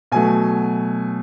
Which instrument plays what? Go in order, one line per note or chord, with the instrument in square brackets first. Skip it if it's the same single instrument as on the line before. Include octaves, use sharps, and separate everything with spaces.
[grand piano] B2 F#3 A3 G#5